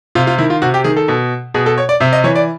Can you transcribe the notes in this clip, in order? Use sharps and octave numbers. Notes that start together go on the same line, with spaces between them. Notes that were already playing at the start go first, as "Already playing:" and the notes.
C3 F4
F4
D#3 E4
F4
C3 F#4
G4
D#3 G#4
A4
B2
B2 G#4
A4
C#5
D5
C3 E5
D#5
E3 C#5
D5